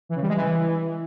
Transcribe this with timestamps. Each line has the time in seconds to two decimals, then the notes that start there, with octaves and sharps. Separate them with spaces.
0.09 E3
0.16 C#3
0.22 G3
0.28 G#3
0.34 E3